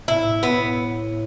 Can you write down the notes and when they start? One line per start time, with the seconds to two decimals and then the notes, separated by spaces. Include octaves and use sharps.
0.08 A2 E4
0.26 A2
0.43 B3